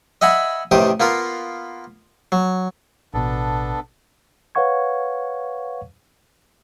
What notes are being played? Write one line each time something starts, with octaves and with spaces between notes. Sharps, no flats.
D#5 E5 F#5 G#5 B5
A1 C3 D#3 G4 D#6
A#3 B3 F4 A#4
F#3
A1 B2 B3 D4 A4
B4 C#5 F5 F#5 C#6 G#6